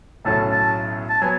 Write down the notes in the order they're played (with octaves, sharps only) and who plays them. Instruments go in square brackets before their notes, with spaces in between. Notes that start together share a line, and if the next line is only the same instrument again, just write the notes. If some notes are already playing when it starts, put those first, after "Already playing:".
[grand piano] B1 A2 F#3 A3 C#4 [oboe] A5
[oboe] A5
A5
[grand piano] F#3 B3 [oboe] G#5